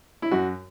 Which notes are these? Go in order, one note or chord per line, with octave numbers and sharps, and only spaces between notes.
E4
F#2 F#4